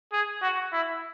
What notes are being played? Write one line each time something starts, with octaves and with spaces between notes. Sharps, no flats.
G#4
F#4
E4